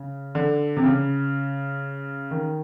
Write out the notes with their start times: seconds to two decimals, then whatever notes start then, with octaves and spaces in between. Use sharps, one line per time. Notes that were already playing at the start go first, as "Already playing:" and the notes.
Already playing: C#3
0.35 D3
0.77 C3
0.84 C#3
2.31 D#3